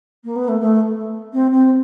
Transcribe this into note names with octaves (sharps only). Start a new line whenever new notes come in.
A#3
B3
A3
A3
C4
C4